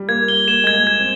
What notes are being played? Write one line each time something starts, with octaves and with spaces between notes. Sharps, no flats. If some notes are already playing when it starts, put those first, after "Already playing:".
Already playing: G3
A#3 G#6
G7
A#3 E7
G#3 G#6
A#3
G#6
C4